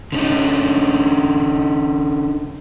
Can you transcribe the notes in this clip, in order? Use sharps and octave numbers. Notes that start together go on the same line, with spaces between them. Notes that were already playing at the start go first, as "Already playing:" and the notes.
D3 C#4 D#4